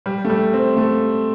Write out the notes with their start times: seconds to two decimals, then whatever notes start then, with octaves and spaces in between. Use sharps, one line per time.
0.06 G3
0.25 A3
0.29 G3
0.53 C4
0.77 A3